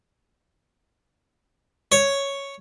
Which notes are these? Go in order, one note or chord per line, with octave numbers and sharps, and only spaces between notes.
C#5